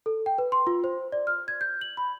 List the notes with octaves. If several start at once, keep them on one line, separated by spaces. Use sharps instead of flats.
A4
G5
B4
C6
F4
C5
D5
F6
G#6
G6
F#7
B5